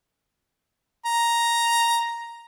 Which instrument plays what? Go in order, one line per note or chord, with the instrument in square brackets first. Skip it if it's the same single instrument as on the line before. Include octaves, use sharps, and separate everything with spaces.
[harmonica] A#5